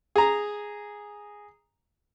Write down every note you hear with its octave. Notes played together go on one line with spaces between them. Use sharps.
G#4 A#5